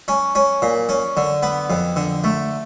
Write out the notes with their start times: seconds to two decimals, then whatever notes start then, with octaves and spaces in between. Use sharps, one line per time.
0.08 C#4
0.35 C#4
0.62 A#2
0.89 C#4
1.17 D3
1.43 B3
1.70 F2
1.96 D3
2.24 A3